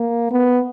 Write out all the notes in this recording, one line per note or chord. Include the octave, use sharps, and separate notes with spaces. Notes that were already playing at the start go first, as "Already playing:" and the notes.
Already playing: A#3
B3